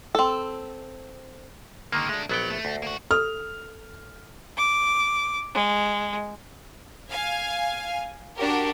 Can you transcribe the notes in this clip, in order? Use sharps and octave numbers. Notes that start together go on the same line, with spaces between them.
C4 A4
D3 D#3 G#3 A#3
G#3 A3 D4
A#1 F#3 B3 G5
A3
D2
A#3 F#4
A4 F6
D6
G#3
F5 G#5
D4 F#4 G4 A#4